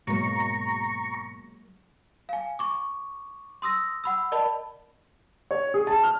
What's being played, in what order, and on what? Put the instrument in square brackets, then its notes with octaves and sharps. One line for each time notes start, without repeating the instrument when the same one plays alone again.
[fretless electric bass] G#2 B2 [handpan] F#3 G#3 A#3 [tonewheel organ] A#5 C#6
[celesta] F5 G#5
C#6 D6
C6 D#6 E6 A#6
F#5 B5 E6
A#4 D5 D#5 A5 B5
[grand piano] C#5
G#4
A5
F6